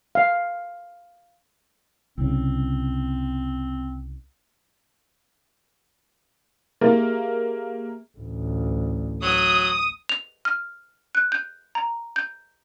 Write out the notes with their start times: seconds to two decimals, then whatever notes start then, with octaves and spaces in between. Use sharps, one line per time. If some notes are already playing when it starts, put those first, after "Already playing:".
0.15 F5
2.18 C2 C#3 C4
6.81 A#3 G4 G#4 E5
8.18 A1 D2
9.22 F#3 D#6
10.09 F7
10.45 F6
11.15 F#6
11.32 G6
11.75 A#5
12.16 G6